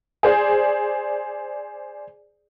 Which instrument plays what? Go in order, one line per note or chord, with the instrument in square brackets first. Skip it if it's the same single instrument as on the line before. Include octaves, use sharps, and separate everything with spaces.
[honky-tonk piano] G#4 C5 D5